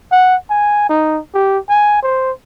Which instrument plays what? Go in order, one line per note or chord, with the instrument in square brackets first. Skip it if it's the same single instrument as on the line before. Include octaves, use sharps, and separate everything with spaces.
[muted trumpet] F#5
G#5
D#4
G4
G#5
C5